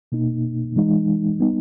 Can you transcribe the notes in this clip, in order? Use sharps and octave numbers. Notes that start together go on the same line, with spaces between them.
B2 A#3 D#4
E3 G#3 D#4
G3 B3 D#4